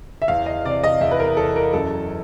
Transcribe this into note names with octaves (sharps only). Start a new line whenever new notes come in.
E5
E2 F5
D#5
C3 D5
D#5
E2 E5
B4
A#4
E2 A4
A#4
F#2 A4